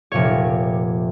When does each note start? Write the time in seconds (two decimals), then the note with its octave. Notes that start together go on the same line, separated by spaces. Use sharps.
0.12 F1 A#2 C#5